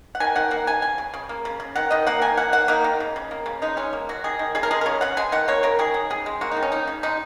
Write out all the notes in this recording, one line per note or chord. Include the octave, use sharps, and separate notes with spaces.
F#5
D#3 G#5
D#3 F#5
A#3 F#5
C#3 G#5
C#3 G#5
C#3
C#3
A#3
C#3
C#3
D#3 F#5
D#3 D#5
A#3 F#5
D#3 G#5
A#3 F#5
A#3 F#5
A#3 D#4
D#3
C#3
C#3
A#3
C#3
G#3 D#4
G#3 C#4
A#3
F#3 F#4
D#3 G#4
D#3
C#3 G#4
A#4
G#3 G#4
A#4
C#3 C#5
C#3 F#5
G#3 G#5
D#3 F#5
A#3 C#5
C#3 A#4
D#3 G#4
F#3
C#3 G#4
G#3
A#3 F#4
D#4
D#3
C#4
A#3 D#4
C#3
G#3 D#4